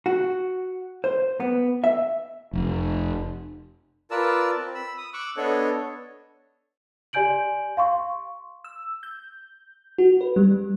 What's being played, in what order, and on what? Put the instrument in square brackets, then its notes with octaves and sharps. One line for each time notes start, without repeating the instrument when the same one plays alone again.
[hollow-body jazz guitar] F#4
C5
B3
E5
[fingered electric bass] F1
[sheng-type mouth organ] F4 A#4 B4 D5 A5 E6
C4
B5 E6
D#6
C#6 D6 E6 F#6
B3 D4 A4 C#5 D#5
[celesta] G4 D5 G#5 G6 D7 F#7
F5 C6 C#6
[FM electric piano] E6
G6
F#4
B4
G3